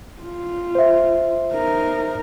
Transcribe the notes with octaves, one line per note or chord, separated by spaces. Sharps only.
F4
C5 E5
D#4 A#4